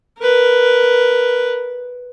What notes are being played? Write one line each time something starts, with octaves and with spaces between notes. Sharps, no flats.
A#4 B4